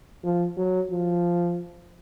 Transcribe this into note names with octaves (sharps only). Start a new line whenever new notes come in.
F3
F#3
F3